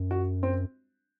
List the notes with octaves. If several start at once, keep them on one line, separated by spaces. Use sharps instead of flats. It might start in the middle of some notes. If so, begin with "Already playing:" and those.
Already playing: F#2
F#4
C4